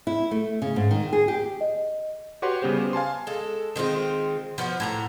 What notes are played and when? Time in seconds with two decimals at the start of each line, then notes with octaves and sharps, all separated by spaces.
0.07 E4
0.31 A3
0.62 C#3
0.76 G#2
0.91 D#3
1.13 G#4
1.28 G4
1.61 D#5
2.42 F#4 G4 B4 C#5 F#5 C6
2.62 C#3 G3 B3 G4 C5
2.93 F5 G#5 A5 C6
3.27 G#3 A4
3.76 D#3 G#3 C4 F4
4.58 F3 B3 C#4 F#4
4.80 A2 G4 A#5